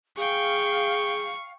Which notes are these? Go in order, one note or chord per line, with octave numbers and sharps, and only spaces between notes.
G#4 F5 G5 C#6